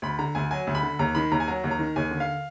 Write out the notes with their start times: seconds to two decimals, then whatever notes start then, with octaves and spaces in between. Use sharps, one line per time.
0.02 D2 B5
0.19 D3 A#5
0.35 D2 G#5
0.51 F#3 G#5
0.67 D2
0.75 B5
0.83 D3
0.99 D#2 A#5
1.15 D#3 B5
1.32 D#2 A#5
1.40 G#5
1.48 F#3 A#5
1.64 D#2
1.71 A#5
1.79 D#3
1.96 D#2 G#5
2.11 D3
2.20 F5